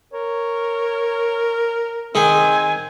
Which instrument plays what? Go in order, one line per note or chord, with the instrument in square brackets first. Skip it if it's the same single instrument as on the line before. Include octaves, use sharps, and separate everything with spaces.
[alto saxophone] A#4 [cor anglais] C#5
[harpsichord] D#3 G#4 [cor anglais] C4 [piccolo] G#5